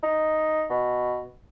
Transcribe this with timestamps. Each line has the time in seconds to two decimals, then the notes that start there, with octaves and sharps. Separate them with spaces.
0.03 D#4
0.70 B2